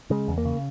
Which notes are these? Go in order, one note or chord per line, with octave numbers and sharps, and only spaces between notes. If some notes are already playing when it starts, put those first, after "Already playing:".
C#3 G#3
E2
A#3
C#3